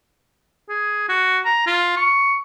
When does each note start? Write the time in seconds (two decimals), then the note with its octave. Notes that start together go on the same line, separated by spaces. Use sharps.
0.69 G#4
1.09 F#4
1.45 A#5
1.67 F4
1.97 C#6